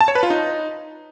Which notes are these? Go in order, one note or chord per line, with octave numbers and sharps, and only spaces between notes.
A5
C#5
B4
F4
D#4